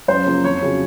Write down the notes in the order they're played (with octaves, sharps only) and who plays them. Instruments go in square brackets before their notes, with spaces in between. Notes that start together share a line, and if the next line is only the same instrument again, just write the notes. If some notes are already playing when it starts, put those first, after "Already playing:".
[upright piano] F#2 C5
C#3 F3 A#3
F2 C#5
C#3 F#3